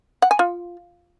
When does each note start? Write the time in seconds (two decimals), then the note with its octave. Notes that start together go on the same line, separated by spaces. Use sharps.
0.22 F#5
0.31 G#5
0.39 F4